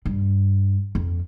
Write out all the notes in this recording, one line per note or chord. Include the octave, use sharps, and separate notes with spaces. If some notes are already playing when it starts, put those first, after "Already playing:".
G2
F2